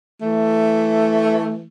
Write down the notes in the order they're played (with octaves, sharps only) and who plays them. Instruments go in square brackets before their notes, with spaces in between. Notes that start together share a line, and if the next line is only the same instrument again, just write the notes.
[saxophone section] E3 A3